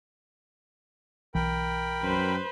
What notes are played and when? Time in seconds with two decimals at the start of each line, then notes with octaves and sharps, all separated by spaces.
1.35 B1 E3 A#4 G5 B5
2.03 F#2 B4 C5